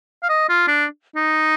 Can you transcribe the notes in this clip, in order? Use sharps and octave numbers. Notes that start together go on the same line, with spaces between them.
F5
D#5
F4
D4
D#4